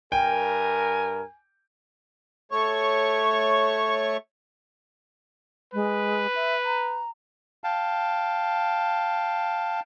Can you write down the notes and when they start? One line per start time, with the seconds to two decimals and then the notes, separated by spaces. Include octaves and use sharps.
0.12 G2 A#4 G5 G#5
2.52 A3 C#5 C#6
5.74 G#3 B4
6.35 E5
6.65 A#5
7.64 F5 G5 A5